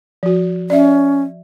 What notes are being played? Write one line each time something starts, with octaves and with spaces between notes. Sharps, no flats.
F3 F#4
C#4 D5 E5